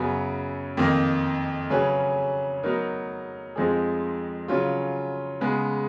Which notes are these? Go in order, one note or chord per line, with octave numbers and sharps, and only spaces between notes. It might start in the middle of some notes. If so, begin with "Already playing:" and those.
Already playing: F#2 C#3 F#3 B3
F2 D#3 A#3 D#4
C#3 F#3 C#4 G#4 B4
F#3 B3 D#4 A#4
F2 F3 G#3 D#4 G#4
C#3 F#3 C#4 F4
C#3 G#3 B3